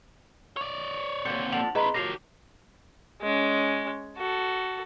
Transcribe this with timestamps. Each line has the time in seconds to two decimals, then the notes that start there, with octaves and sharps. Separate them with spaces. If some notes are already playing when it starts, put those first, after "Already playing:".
0.57 C#5 D5
1.25 D3 A#3 C4 C#5 C#7
1.52 F3 D4 A4 F#5 F7 F#7
1.75 C4 E4 G#4 B4 D#5 A#5
1.94 F3 F#3 G4 A#4 A#6 C7 F7
3.22 G#3 C#4
4.17 F#4 A4